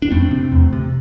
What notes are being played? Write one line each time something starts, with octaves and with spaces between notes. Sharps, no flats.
D4
F2 A3 C4
C3
E2
C3